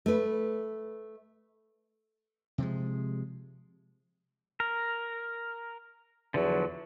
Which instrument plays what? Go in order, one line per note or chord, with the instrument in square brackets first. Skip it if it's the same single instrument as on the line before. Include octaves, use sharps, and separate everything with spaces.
[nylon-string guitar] A3 B4
[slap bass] C3 F3 G#3
[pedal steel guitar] A#4
[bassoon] E2 [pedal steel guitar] D3 F3 F#3